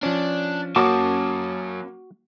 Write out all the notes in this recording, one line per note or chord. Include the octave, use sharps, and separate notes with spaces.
F3 C#4 D4
F#3 A#3 C#4 F#4 A5 D6 D#6